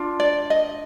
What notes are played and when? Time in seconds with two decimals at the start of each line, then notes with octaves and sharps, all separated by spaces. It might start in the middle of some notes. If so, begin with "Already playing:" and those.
Already playing: D4 F4
0.20 D5
0.50 D#5